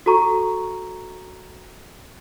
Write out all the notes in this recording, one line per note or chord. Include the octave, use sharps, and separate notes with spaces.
F#4 A4 A#5 C#6